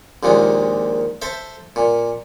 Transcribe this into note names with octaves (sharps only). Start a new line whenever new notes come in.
A#1 D#2 A#2 G#3
A4 C5 E5
A#2